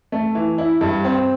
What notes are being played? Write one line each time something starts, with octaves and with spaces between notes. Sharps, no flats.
A3
E3
E4
G2
C4